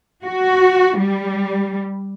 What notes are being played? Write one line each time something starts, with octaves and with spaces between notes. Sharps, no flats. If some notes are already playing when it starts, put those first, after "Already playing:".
F#4
G3